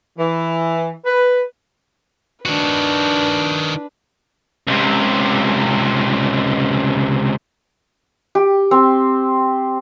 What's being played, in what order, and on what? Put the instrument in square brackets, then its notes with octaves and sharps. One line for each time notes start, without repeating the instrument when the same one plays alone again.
[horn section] E3
B4
[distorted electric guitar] D#3 F#4 [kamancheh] D4 B4
[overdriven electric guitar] C#2 C3
[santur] G4
C4